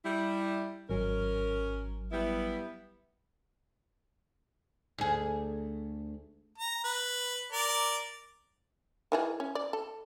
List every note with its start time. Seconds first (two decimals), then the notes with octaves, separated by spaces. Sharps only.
0.04 G3 E4
0.90 G#1 F#3 C#4 A#4
2.12 G3 B3 E4
4.98 D2 G#4
6.58 A#5
6.84 B4
7.52 A#4 D5
9.12 D#3 E3 G#4
9.40 C#4
9.55 D5
9.73 A4